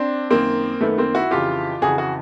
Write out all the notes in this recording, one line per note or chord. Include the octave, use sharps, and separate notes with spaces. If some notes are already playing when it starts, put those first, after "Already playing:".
Already playing: C4 D4
F#2 D#3 A#3 C4
F#2 D#3 A3 B3
A#3 C4
E4 F#4
F2 C#3 E3 F4 G4
F2 C#3 E3 F#4 G#4
F#4 G#4